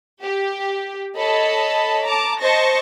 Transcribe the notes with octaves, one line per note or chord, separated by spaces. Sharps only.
G4
A4 C#5 D#5 A5 B5
A5 A#5 D6
C5 D#5 A5 C#6 A#6